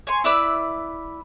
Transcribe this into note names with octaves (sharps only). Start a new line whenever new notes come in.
C#5 G#5 C6
E4 B4 D5 E6